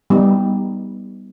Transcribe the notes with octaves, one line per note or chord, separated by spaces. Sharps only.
G3 B3 D#4